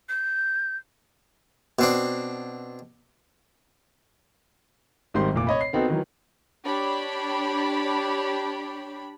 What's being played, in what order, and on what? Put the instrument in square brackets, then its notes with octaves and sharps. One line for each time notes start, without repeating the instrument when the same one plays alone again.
[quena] G6
[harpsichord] B2 C4 D4
[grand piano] G#1 D#3 G3 C5 C6
F1 A#2 D6
C#5 D#5 B5
C7
B3 C4 D#4 F#4 A4
D#3 E3 F#3
[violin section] D4 G4 C#5 B5